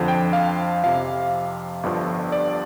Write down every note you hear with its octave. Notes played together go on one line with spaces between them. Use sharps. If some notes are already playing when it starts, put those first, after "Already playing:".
Already playing: F2 D3 F3 C5
G5
F5
F2 C3 F3 F5
G1 G2 D3 F3
D5